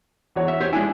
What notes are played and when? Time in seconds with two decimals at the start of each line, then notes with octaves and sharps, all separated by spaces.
0.36 E2 F#4 C#5
0.48 E5
0.61 G4 C5 C#5
0.73 G#3 D4 E4 G#5